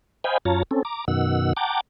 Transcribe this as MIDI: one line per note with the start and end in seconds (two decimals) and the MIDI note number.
0.24 0.38 72
0.24 0.38 75
0.24 0.38 77
0.24 0.38 79
0.24 0.38 80
0.24 0.38 83
0.45 0.63 42
0.45 0.63 65
0.45 0.63 73
0.45 0.63 81
0.45 0.63 82
0.71 0.83 60
0.71 0.83 61
0.71 0.83 69
0.85 1.05 82
0.85 1.05 86
1.08 1.53 42
1.08 1.53 47
1.08 1.53 51
1.08 1.53 78
1.08 1.53 88
1.57 1.81 78
1.57 1.81 79
1.57 1.81 81
1.57 1.81 82
1.57 1.81 86